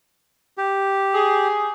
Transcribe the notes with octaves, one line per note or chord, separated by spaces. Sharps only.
G4
G#4